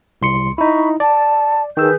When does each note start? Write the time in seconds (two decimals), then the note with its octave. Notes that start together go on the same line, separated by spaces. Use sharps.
0.22 C2 C6 C#7
0.58 D#4 E4 B5 C#6
1.00 D5 A5
1.77 D#3 G#4 B4 E6 G6